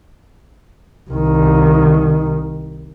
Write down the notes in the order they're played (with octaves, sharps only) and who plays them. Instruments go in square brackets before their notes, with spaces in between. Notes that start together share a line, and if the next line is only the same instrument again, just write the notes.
[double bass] C2 D#3